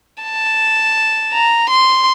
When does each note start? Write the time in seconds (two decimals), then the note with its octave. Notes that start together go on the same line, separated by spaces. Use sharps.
0.23 A5
1.33 A#5
1.70 C6